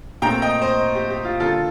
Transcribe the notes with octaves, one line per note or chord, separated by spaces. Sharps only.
A#2 A3 C4 G5 A#5
D#5 G5
C5 D#5
G4
G4
F4
D3 G3 A#3 F4 A4